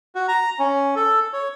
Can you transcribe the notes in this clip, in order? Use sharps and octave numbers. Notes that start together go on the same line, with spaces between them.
F#4
A#5
C#4
A4
C#5